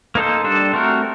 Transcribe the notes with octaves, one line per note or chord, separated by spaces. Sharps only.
A#3 D#4 A4 C5
G3 D4 A4 C5
A3 C4 F#4 A#4